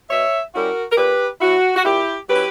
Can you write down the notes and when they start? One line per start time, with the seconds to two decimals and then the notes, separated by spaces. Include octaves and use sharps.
0.09 B2 C#5 E5
0.54 G3 C#4 E4 F#4 A#4
0.92 A#4
0.97 A#2 G4 B4
1.41 F#3 C#4 E4 F#4
1.75 F#4
1.84 A#2 E4 G4
2.28 F#3 C#4 E4 G4 B4